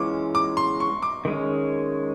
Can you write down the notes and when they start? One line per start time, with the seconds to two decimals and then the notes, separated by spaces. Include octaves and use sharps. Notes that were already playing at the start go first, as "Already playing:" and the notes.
Already playing: E3 G#3 C#4 F4 D6
0.35 D6
0.57 C6
0.80 C#6
1.02 D6
1.25 D#3 G#3 C#4